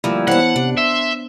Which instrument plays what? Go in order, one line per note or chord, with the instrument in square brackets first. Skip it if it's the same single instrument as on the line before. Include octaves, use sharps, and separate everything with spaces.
[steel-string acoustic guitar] D2 F3 [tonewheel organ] G3 A#3 E4
[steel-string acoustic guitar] E3 A5 [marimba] B3 C5 C#5 [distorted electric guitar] F#5
[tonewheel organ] C3 [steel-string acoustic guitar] D4
[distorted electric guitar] E5 [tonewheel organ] C6